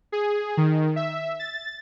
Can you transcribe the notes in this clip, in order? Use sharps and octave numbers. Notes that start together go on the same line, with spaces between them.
G#4
D#3
E5
A6